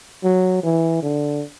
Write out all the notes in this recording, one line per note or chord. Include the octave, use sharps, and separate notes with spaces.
F#3
E3
D3